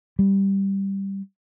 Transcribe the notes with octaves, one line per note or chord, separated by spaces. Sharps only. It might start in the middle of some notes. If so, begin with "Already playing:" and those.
G3